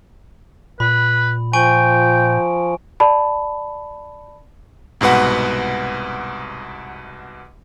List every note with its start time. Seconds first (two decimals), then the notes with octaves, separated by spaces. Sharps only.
0.80 A#2 B4 B5
1.53 F3 G5 G#5 C#6 D7
3.00 D5 A5 B5
5.01 C2 G#2 B2 B4 F#5